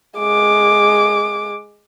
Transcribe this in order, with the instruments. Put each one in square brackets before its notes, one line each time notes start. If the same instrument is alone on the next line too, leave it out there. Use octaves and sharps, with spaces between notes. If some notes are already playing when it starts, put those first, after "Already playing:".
[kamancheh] G#3 D6